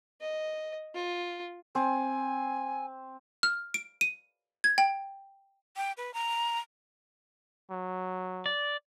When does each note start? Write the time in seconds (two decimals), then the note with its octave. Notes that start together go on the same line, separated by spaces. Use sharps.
0.21 D#5
0.94 F4
1.75 C4 G#5
3.43 F6
3.74 D7
4.01 D#7
4.64 G#6
4.78 G5
5.76 G5
5.97 B4
6.14 A#5
7.71 F#3
8.46 D5